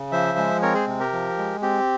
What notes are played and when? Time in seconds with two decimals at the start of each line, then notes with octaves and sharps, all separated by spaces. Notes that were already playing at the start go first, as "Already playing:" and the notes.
Already playing: C#3
0.12 F3 C5 E5
0.38 G#3
0.62 C4 A#4 C#5
0.74 G#4 C5
0.88 C3
1.00 G4 A#4
1.13 F3
1.38 G#3
1.62 C4 G4